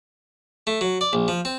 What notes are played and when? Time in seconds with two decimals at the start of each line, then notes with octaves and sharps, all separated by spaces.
0.67 A3
0.81 F#3
1.01 D5
1.13 A#1
1.28 F3
1.45 C4